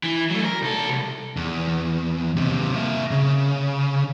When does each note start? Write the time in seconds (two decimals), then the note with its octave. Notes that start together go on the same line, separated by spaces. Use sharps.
0.03 E3
0.30 F#3 A3
0.45 A#4
0.62 C2 A4
0.89 C2
1.37 E2
2.36 D#2 C3
2.76 A#3 E5
3.11 C#3